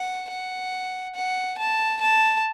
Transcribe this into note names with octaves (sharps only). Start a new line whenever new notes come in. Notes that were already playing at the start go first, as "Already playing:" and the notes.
Already playing: F#5
F#5
F#5
A5
A5